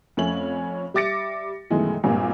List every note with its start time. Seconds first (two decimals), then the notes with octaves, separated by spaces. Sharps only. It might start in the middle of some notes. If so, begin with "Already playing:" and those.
0.17 F2 A3 C#4 C#5 F#7
0.94 G3 E5 D6 A6 A#6 C#7
1.70 F#2 B2 D#3 E3 G#3 A3
2.04 G#1 G2 A#2 A#3